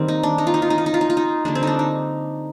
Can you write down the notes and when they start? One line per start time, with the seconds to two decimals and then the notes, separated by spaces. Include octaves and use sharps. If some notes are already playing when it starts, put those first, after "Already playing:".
Already playing: D#3 G3 A#3 C4
0.08 D#4
0.23 D4
0.38 D#4
0.47 F4
0.54 D#4
0.62 F4
0.70 D#4
0.78 F4
0.86 D#4
0.94 F4
1.01 D#4
1.10 F4
1.17 D#4
1.45 D3 G3 A#3 D4
1.55 C4
1.63 D4 D#4
1.79 D#4